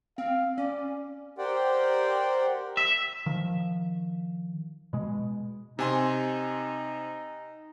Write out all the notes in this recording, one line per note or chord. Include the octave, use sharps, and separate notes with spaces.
C4 F5
C#4 D5
G4 A#4 C5 D5 F#5 G5
E5
D#3 F3
B2 G#3
C3 D#4 G#5 C6